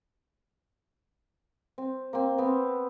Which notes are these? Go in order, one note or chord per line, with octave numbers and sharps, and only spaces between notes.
C4
A#3 C4
B3 C4